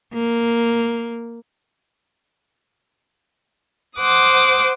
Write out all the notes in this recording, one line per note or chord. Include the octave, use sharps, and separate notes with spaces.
A#3
C5 F#5 D6 D#6